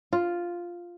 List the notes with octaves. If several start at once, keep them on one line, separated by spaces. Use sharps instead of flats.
F4